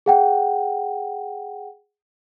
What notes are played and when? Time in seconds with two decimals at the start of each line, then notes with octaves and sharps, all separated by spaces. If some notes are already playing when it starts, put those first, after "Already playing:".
0.06 G#4 F#5 G5